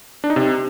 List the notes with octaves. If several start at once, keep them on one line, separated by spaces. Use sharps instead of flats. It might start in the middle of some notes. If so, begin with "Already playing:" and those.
D4
D#4
C3